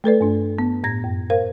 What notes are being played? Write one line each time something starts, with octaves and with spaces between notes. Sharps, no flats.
A3 A4 B4 D5
G2 D4
B3
A2 G#6 A#6
F#2
A#4 C5 F5